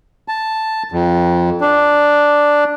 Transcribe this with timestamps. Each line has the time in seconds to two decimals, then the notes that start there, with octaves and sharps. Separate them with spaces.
0.28 A5
0.92 F2
1.61 D4